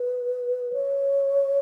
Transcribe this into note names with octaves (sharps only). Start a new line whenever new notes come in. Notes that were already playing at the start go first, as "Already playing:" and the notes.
Already playing: B4
C#5